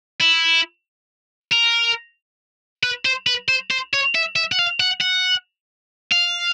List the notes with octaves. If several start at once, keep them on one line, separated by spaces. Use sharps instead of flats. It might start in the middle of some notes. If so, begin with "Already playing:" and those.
E4
A#4
B4
C5
B4
C5
C5
C#5
E5
E5
F#5
F5
F#5
F#5
F5